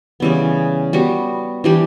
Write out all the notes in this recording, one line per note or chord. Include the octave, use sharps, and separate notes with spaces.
C#3 E3 G3 B3
G3 B3 F#4
E3 G3 D4 G4